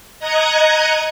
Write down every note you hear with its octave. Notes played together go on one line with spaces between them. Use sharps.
D#5 A#5 D#6 F#6 G#6 C#7